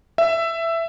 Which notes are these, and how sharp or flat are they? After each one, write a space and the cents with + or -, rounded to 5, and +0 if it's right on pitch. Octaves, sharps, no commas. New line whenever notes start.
E5 +10